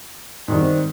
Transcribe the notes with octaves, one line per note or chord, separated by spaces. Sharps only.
G#2 D#3 G3 C4